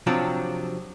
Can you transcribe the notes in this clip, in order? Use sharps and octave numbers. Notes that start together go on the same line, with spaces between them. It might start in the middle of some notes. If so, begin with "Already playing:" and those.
C3 F3 F#3 C4 D4